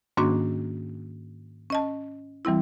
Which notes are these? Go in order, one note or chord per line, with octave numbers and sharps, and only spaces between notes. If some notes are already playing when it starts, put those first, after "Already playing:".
G#2 D#3 A#3 C#4 D4 F#4
C#4 D#5 A5
E3 G3 C4 E4